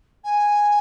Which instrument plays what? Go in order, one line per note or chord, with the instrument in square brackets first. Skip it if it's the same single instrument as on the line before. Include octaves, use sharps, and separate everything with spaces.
[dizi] G#5